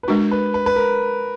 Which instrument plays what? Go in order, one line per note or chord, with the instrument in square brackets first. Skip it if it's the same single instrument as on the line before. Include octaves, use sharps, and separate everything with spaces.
[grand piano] B4
[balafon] G#3 D4 F#4 [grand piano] A#4
[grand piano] B4
B4
B4
A#4